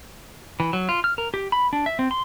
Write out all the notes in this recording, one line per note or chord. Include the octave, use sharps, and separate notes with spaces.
E3
F#3
F4
F6
A#4
G4
B5
D4
E5
C4
C6